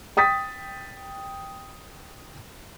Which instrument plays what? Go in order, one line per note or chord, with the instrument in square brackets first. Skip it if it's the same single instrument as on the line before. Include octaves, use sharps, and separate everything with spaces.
[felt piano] G5 D#6 A6 B6